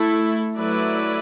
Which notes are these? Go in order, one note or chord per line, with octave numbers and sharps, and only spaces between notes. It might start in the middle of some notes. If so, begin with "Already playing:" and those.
Already playing: A3 E4 A4
F#3 A3 E4 B4 D5